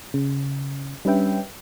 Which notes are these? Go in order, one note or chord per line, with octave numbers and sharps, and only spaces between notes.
C#3
G3 C#4 D4 B4 E5 G5